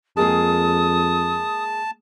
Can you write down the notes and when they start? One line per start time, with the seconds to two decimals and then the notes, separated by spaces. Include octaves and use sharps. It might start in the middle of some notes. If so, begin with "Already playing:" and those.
0.17 F2 G#3 A#3 G#4 A5 D#6